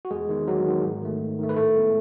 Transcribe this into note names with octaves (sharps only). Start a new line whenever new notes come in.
F#4
E2 G#3 G#4
D#3 G#3 B3
E2 F#3 F#4
D#3 G#3 B3
G#2
D#3 A3
G#2
D#3 A3
B4
A2 A3 A4
G#3 B3